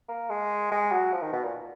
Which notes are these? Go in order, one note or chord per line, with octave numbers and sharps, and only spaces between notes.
A#3
G#3
G#3
F#3
F3
D#3
B2
A#2